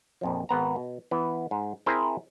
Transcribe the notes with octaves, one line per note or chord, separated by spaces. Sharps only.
A#1 F2 F3
G#1 B3 A#5
B2
E3 B3
G#2
C4 E4 G#4 A#4 C5 E5